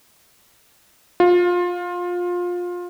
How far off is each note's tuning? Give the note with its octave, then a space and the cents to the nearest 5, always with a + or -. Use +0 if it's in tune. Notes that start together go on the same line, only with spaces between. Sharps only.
F4 +20